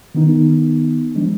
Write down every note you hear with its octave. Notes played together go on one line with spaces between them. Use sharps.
D#3 B3 D#4
F3 G#3 D4